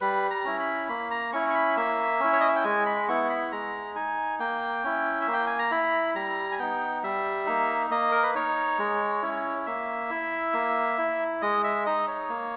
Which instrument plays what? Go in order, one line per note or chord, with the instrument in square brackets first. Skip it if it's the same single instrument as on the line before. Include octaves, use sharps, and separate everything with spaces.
[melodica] G3 B4
A#5
C#4 E4
B5
A#3 B5
A#5
C#4 E4 C#6
C#6
B5
A#3 E5
C#4 E4
C#5
D#5
E5
G5
G#3 G#5
B5
B3 E4 C#6
B5
G#3 A#5
D#4 G#5
A#3 G5
C#4 E4
E5
A#3
G5
G#5
A#5
E4 B5
G3 A#5
G#5
B3 D#4 G5
G3 E5
A#3 D#4
A#3 D#5
A#4
B4
D#4 C#5
G#3
C#4 E4
A#3 E5
E4
A#3
E4
G#3 D#5
E5
D#4 D#5
C#5
A#3